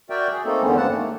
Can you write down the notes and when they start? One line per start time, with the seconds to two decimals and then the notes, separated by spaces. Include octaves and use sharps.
0.10 F#4 A#4 D5 E5 G5
0.32 G#4
0.45 A3 A#3 C4 D#4 A4
0.62 E2 D3 D#3 G#3 B3 C#4
0.77 G2 A#3 C4 F#5 A5
0.89 D#3 A3 A#3